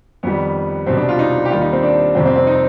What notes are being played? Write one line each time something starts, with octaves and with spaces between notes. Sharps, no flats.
F2 D#3 G3 B3
C2 B2 G3 C4
D4
F4
D#4
G4
D#2 D#3 G3 F4
D#4
C4
D4
F2 C3 G3 C4
C4
C4
D#4